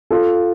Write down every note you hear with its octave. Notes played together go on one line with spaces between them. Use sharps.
F4 A4